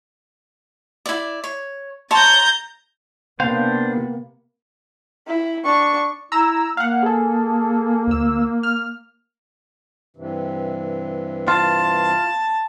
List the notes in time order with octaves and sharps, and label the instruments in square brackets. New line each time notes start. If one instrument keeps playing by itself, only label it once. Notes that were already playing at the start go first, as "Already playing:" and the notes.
[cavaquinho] E4 D5
C#5
[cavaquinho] C#5 A5 C6 [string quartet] A#5 G6 A6
[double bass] C3 B3 [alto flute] A#3 [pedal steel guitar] D4 C5 [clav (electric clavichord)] F5
[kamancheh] E4
D4 C#6
[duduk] E4 [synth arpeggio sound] A#5 E6
[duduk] A#3 [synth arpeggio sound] F5 F#5
[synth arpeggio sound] G#4 A4
D2 E6
F6
[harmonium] G2 C3 E3
[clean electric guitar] F4 [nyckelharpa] A5